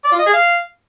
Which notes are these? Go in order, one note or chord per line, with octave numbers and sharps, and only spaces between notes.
D5
F4
D#5
G#4
F5